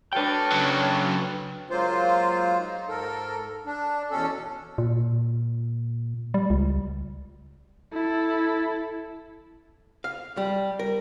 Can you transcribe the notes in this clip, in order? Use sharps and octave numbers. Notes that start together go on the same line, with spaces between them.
D4 F#4 A4 B4 C#5 G5 F6
C#3 F#3
F#3 G#3 A#3 F4 C5
D#4
G#2 A4 A#4
D4
E2 B2 C#4 A4
A#2
G3
C#2
E4 A4
F5
G3
A#4